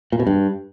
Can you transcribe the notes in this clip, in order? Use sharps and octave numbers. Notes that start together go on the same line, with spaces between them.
A#2
B2
G2